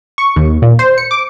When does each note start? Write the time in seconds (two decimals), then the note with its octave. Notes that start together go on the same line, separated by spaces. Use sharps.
0.18 C#6
0.36 D#2
0.62 A#2
0.79 C5
0.98 C#7
1.11 D6